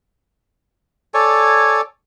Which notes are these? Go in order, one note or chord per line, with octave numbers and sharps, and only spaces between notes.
A4 C#5 D5 G#5